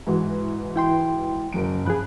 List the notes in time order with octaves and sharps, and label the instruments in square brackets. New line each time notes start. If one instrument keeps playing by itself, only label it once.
[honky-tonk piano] G#2 E3 F#4
[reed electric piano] E4 G5 C6
[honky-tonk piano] F#1 F#3 D7
[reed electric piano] G2 F3 G#4 [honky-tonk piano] B5 F#6